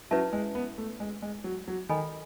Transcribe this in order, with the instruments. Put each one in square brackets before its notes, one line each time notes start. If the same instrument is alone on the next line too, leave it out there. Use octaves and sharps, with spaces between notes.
[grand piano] F#3 [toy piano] C#4 E4 B4 E5 A5
[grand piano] G#3
B3
A3
G#3
G#3
F#3
F#3
[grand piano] D#3 [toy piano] A4 D#5 G#5 B5